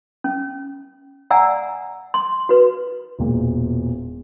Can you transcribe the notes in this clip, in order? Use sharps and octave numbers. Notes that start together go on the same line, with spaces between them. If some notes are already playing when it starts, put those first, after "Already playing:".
C#4
D5 F#5 G#5 A#5 E6
C6
F#4 B4
E1 A#2